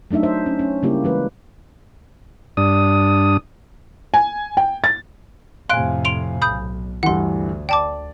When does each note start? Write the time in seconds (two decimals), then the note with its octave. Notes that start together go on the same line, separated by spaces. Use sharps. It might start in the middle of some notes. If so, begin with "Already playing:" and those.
0.11 F#3 A3 D4 D#4 E5
0.23 C5 E5
0.46 C#4
0.59 C#4
0.83 C#3 G3 A#3 E4 G4
1.04 E3 G#3 B4
2.57 G2 D4 D#6
4.14 G#5
4.57 G5
4.84 A6
5.70 F2 A2 C3 F5 G#5 C6 F#6 D7
6.05 C6 D7 F7
6.42 B1 B5 D#6 G6
7.03 D2 G2 E3 F#5 C6
7.69 D5 G5 A5 D6